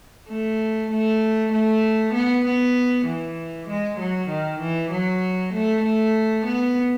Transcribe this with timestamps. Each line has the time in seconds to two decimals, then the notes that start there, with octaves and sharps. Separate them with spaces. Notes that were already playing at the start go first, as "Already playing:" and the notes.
0.28 A3
0.91 A3
1.52 A3
2.13 B3
2.44 B3
3.06 E3
3.68 G#3
3.99 F#3
4.29 D#3
4.59 E3
4.91 F#3
5.53 A3
5.83 A3
6.45 B3